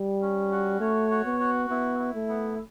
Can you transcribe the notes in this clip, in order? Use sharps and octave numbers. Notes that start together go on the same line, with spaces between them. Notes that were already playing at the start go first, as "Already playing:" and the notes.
Already playing: G3
C#4
F#4
A3 C#5
F#4
B3
F#4
B3 E4
E4
A3
B3